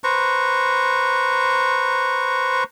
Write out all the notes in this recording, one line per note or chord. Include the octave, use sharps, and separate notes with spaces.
B4 C5 A#5 C#6